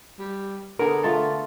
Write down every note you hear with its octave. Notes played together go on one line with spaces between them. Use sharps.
G3
D3 B3 G#4 A#4
A3 F4 A4